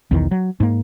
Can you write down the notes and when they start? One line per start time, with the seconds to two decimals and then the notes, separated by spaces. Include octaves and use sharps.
0.11 B1 E2 D#3
0.31 F#3
0.60 G#2 A#3